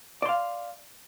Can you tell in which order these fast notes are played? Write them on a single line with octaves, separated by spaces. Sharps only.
D5 C6 F5